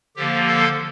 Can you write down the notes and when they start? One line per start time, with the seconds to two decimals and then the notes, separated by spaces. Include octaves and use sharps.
0.16 D3 F3 A#3 G4
0.47 A4